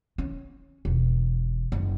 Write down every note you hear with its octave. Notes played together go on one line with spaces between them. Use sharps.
C#4
E1
F#1